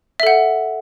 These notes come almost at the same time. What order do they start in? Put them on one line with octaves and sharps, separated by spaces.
E5 A4 F#5